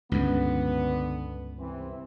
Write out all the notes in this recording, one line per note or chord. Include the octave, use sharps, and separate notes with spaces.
C#2 G2 D3 B3
C2 E3 C4